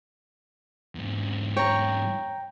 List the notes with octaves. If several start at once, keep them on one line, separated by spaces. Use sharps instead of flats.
E2 G#2
C#5 G5 A#5